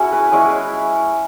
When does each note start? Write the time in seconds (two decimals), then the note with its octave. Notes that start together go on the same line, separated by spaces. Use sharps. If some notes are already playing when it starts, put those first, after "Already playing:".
Already playing: C#4 E4 F#4 G#4
0.13 B4
0.32 G#3 C#4 E4 G#4